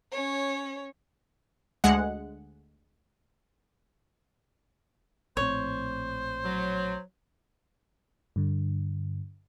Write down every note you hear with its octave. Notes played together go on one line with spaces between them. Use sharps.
C#4 C#5
D2 G#3 F#5
A#1 A2 C4 C5 C#5
F#3
G2 D3